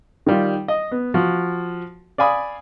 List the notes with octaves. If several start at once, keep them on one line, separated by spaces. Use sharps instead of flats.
D#3 G3 F4
D#5
B3
F3 F#4
D5 F5 G#5 B5 D#6